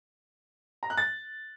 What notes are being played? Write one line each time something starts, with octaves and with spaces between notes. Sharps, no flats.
A#5
F#6
A6